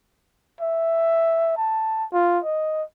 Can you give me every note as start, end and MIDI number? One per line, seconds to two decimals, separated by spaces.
0.60 1.57 76
1.57 2.05 81
2.13 2.39 65
2.44 2.83 75